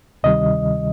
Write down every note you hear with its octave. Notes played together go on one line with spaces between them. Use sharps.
D2 C3 D#3 G3 D#5